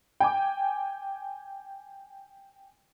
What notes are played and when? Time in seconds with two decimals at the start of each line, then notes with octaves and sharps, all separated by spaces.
0.20 G5 G#5 D6